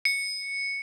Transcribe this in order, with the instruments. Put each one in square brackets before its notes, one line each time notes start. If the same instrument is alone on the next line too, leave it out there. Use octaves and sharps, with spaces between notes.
[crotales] C#7